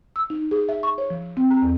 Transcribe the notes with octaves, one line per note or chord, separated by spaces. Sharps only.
E6
D#4
G#4
E5
C#6
C#5
F3
C4
A#5
E2